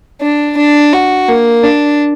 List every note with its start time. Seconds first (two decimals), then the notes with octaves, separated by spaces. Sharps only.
0.21 D4
0.57 D4
0.93 F#4
1.28 A#3
1.63 D4